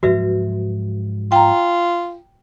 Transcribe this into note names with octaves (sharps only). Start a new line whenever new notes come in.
G#2 F3 F#3 F#4 B4 E5
F4 G5 A#5